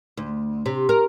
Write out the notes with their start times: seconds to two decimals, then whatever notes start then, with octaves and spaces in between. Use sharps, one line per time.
0.17 D2
0.66 C3
0.89 A#4